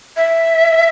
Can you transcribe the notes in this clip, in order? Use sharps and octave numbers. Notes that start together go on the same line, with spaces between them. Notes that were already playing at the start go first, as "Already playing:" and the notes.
E5